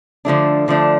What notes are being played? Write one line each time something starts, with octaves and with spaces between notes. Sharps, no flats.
D3 F3 A3 D4
D3 F3 A3 D4